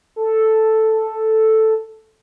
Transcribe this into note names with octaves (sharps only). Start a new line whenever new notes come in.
A4